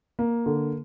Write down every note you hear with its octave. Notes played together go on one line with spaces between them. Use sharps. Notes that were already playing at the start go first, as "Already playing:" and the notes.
A#3
D3